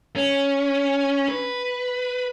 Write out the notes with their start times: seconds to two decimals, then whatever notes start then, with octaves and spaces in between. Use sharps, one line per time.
0.16 C#4
1.28 B4